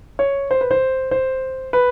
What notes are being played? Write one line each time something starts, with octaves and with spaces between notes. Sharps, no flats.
C#5
C5
B4
C5
C5
B4